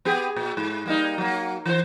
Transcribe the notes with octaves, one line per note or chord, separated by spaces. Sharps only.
B3 G4 G#4
A#2
G#2
G3 A#3 D#4
F#3 A#3
E3 C5